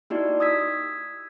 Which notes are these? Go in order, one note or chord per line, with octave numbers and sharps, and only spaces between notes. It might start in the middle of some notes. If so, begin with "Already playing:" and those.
A#3 D#4 E4 F#4 G4 D5
D#6 E6 G#6 B6